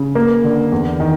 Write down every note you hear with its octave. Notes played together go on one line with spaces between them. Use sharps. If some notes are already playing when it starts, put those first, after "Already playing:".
Already playing: C#3
A#3
D3
E2
D#3